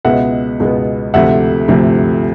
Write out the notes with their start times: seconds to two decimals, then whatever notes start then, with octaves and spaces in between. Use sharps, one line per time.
0.05 C#2 B2 G#3 B3 E5 F#5
0.60 C#2 B2 G#3 B3
1.14 D2 C3 F3 A3 E5 F#5
1.68 D2 C3 F3 A3